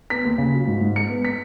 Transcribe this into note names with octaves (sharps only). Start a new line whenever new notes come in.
B3 B6
D#2
C#3
F#3
G#2
G#2
G#3 C#7
B3
B6